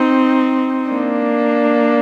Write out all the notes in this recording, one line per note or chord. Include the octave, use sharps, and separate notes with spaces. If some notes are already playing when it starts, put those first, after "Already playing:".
Already playing: C4 D#4
A#3 D4